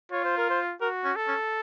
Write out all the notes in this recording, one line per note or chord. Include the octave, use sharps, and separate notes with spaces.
F4 C#5
C5
A#4
C5
F#4 A#4
C#4
A4
C#4